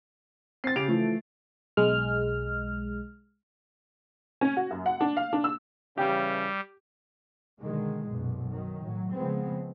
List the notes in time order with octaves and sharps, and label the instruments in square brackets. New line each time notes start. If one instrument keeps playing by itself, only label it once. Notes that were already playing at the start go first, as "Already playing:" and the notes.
[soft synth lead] C4 [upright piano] A6 C7
[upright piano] C#3 D7 F7 [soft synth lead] G4
[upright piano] E3 F3 [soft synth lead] A3
[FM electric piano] B1 G#3 F6
[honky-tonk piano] C#4
F#4
F#2
F#5
D4
F5
D4
E6
[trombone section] C#3 E3 [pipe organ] G3 [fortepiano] G4
[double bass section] B2 D3 D#3 G#3
B1 F#2 A#2
D#3 F#3
A2 F#3
C#3 F3 G#3 B3 C4